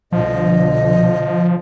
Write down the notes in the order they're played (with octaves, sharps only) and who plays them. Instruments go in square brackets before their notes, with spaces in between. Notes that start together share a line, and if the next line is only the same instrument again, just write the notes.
[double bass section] C2 B2 D3 [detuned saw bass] F3 [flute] D#5